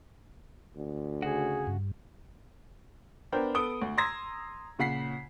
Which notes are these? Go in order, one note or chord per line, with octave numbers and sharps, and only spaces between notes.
D2
C#3 F#4 G#4
G2
B3 D4 A#4 C5 G5
B3 A4 D#6 D7 G7
D2
A#5 C6 D#6 E6 G#6 A#6
A#2 C#3 F#5 B6 C7